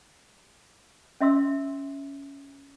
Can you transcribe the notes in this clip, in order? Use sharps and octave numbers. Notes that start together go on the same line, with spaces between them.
C#4 E5 C6 E6